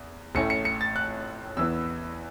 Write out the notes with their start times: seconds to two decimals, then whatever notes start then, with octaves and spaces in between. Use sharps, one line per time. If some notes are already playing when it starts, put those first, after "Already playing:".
Already playing: E2
0.35 A1 A2 A3 C#4 C#7
0.50 C#7
0.65 C#7
0.81 A6
0.96 F#6
1.57 E2 E3 B3 E6